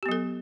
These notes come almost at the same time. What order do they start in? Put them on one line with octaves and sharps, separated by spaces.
G4 B3 F#3 A4